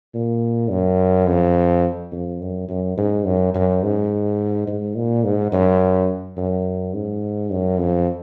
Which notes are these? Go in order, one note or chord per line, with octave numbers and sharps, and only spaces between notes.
A#2
F#2
F2
F2
F#2
F#2
G#2
F#2
F#2
G#2
G#2
A#2
G#2
F#2
F#2
G#2
F#2
F2